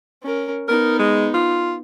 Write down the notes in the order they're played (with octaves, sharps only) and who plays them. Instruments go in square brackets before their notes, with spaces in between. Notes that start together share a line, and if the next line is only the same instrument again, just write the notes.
[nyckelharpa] C#4 A#4
[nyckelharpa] B3 D#4 [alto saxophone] A#4
[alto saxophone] G#3
F4